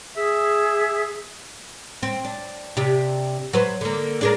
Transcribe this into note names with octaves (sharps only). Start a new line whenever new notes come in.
G#4 E5
C4
D4
C3 D4 G4
F#3 B4 C5
D3 A#3
D4 G#4 A#4